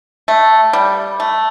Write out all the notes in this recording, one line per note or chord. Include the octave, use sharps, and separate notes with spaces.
A3
G3
A3